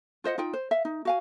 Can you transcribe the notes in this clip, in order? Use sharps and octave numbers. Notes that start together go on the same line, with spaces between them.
F4 C5 D#5 F#5
D#4 F4 G5
C5
E5 F5
D#4
F#4 F5 G#5